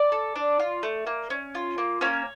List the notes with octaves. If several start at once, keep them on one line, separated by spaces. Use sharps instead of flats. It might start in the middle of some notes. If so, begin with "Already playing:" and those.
Already playing: D5
A4
D4
F4
A3
A#3
C#4
F4
A#3
A#3 C#4 C#5